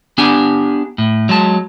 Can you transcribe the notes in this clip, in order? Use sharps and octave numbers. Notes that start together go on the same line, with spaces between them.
B3 D4 G4 G#5
A2
F#3 G#3 A5